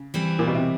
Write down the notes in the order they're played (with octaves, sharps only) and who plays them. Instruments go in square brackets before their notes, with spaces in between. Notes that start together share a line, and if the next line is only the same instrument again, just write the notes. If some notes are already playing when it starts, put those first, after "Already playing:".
Already playing: [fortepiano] C#3
[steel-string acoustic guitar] E3 G3 C4
[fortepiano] A#2
B2
C3